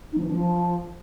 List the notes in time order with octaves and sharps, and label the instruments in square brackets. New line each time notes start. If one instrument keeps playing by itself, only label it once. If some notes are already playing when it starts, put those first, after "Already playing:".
[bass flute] D#4
F3
E3
D4
F3